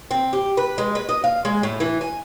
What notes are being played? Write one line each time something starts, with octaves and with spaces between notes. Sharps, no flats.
C4
G4
B4
G#3
B4
D#5
F5
G#3
A2
E3
G#5